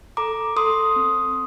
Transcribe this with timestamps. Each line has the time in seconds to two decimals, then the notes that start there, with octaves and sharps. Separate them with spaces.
0.17 A4 A#5 D6
0.56 A4 C6 D#6
0.96 C4